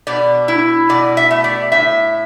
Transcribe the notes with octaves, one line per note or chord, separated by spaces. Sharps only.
B2 D5
E4
B2 D5
E5
A3
D5
A2 E5